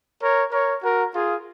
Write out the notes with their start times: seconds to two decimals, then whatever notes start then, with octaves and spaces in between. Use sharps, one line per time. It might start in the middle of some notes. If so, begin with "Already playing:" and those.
0.21 A#4 C#5
0.52 A#4 C#5
0.82 F#4 A#4
1.13 F4 G#4